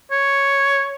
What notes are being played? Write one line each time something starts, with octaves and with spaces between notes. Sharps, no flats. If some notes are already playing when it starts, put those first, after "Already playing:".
C#5